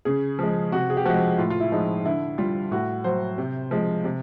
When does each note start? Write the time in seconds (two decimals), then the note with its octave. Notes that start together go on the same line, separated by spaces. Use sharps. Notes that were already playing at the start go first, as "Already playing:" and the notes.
0.05 C#3 G#4
0.39 F3 G#3
0.72 C3 F#4
0.90 G#4
0.97 G4
1.05 F3 G#3 F#4
1.38 A2 F4
1.50 F4
1.60 E4
1.72 F3 G#3 D#4
2.05 D3 E4
2.38 G3 F4
2.71 A2 F#4
3.04 F#3 C5
3.38 C3
3.71 F3 G#3
4.04 C3